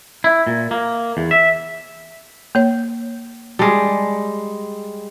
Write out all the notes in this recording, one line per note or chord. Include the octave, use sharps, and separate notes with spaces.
E4
A#2
A#3
E2
E5
A#3 C#5
G3 G#3 A5